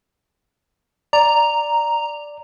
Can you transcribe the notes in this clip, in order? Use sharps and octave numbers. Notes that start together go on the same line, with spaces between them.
D5 A#5